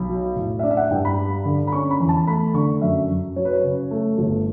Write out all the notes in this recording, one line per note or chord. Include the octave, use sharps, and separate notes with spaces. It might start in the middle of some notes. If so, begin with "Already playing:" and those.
Already playing: B1 B5
F#3
A2
E5
D4 D5
E5
F#5
G2 G5
B5
G3
D3
B5
C#4 C#6
B5
E2
A5
A3 B5
D3 C#6
F#2 E5
F#2
F#3 C#5
B4
C#5
C#3
A3
G1